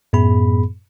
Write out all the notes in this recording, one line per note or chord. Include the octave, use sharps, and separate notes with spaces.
F#2 A2 B3 G#4 B5